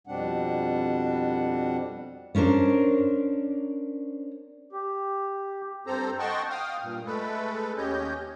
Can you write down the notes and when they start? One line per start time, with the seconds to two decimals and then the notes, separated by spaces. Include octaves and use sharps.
0.07 F2 B2 G3 C4 D4 F#5
2.35 B3 C#4 D4 A#4 C5
4.72 G4
5.87 G2 C4 A4 C5 A#5
6.19 D#5 F#5 G5 A5 C6 C#6
6.50 F5 G5 D#6 F6
6.82 G2 A#2
7.06 G#3 A3 A4 B4
7.77 D#2 C#4 G4 C#5 D#5 G6